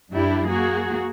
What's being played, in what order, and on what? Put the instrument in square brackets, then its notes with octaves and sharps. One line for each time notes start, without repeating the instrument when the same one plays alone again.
[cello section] F#2 D4 E4 G4
A#3 F#4 G#4